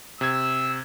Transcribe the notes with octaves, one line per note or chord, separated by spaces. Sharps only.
C3 E6 G#6